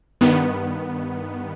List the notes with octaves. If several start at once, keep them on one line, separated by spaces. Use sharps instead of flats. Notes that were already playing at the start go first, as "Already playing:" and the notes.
G2 D#3 B3